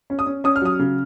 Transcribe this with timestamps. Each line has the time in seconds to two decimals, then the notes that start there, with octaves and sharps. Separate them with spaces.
0.10 C#4
0.19 D#6
0.26 C#4
0.44 C#4 D#6
0.56 F6
0.62 F#3 D#6
0.79 C#3